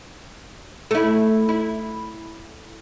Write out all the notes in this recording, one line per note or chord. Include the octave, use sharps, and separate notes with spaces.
A3 E4
E4